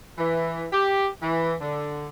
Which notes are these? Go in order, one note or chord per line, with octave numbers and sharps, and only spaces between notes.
E3
G4
E3
D3